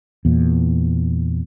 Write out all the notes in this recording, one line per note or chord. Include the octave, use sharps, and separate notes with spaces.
E2 A#2